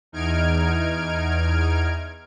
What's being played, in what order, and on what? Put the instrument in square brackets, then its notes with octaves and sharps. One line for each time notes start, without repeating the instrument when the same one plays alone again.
[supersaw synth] E2 D#4 F6 G#6 D7